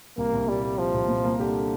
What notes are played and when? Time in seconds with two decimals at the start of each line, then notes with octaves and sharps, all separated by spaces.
0.17 C2 A#3
0.33 C2
0.47 A#2 G3
0.63 G4
0.78 F3 G4
0.94 C2
1.08 A#2
1.24 A#3
1.40 D3 G4